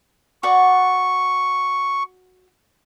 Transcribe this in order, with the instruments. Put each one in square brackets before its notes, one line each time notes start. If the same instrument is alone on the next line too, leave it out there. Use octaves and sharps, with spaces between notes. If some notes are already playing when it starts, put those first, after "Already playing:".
[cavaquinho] F#4 D5 F#5 [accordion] C#6